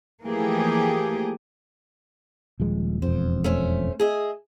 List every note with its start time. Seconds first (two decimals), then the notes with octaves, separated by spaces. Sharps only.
0.23 E3 F3 A3 A#3 G4 G#4
2.60 D#1 F3 G#3
3.02 E1 F2 C5
3.44 A3 C#4 C5
4.00 G#4 D#5 E5